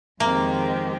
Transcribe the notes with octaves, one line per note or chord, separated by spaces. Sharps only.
F2 D#3 G#3 A#3 C4 G4